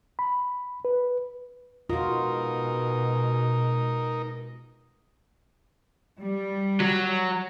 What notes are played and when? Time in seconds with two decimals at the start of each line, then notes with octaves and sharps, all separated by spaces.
0.19 B5
0.85 B4
1.90 B2 G#3 D#4 F4 F#4 A#4
6.20 G3
6.80 F#3